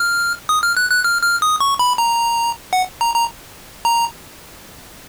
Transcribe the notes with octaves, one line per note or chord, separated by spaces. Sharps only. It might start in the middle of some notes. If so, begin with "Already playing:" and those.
Already playing: F6
D#6
F6
F#6
F#6
F6
F6
D#6
C#6
B5
A#5
F#5
A#5
A#5
A#5